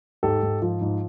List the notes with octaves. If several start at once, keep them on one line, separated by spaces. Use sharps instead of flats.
G#2 G4 A4
G#2
F3
G#2